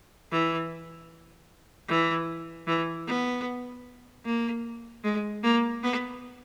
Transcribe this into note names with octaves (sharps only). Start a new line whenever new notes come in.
E3
E3
E3
B3
A#3
G#3
A#3
B3